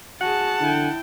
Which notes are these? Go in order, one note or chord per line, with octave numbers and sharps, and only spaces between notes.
F#4 G#4 F#5 A5
D3 E4 G5